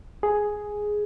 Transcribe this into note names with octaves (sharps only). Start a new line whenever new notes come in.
G#4